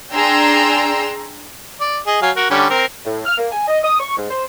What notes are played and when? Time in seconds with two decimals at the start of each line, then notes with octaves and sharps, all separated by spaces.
0.12 D4 G#4 G5 A#5 C6 E6
1.80 D5
2.07 G#4 D#5
2.22 F#3 F5 G#5
2.36 F#4 A#4
2.50 D3 G3 C#4
2.70 C4 A#4
3.05 A2
3.26 F6
3.38 A#3
3.52 G#5
3.68 D#5
3.84 D#6
4.00 C#6
4.17 G#2
4.31 C5